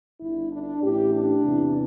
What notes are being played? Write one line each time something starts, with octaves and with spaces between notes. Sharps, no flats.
G1 G2 D3 E4
D4
A1 A2 E3 G4
D4
E2 C3 E3